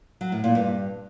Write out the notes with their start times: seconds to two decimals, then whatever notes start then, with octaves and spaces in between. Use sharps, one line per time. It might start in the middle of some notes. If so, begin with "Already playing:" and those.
0.21 F#3
0.32 A2
0.44 A#2
0.55 G2